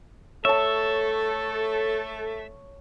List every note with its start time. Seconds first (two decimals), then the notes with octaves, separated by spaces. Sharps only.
0.45 A3 A4 C#5 E5 A5